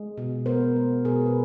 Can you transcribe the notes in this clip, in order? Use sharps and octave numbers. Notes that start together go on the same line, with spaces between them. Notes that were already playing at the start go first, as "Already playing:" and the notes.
Already playing: G#3
B2
B3 A#4 C5
G#3
B2 G#4 A#4
B4